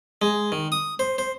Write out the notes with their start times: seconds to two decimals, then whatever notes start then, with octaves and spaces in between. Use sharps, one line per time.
0.22 G#3
0.52 D#3
0.72 D#6
0.99 C5
1.18 C5